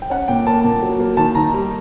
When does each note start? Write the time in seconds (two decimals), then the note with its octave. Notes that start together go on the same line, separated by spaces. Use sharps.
0.02 G5
0.10 C#4 F#5
0.28 A#2 G5
0.47 A#3 A5
0.64 A#2
0.83 F#3
1.00 A#3
1.17 D#3 A5
1.35 D#3 A#5
1.54 G3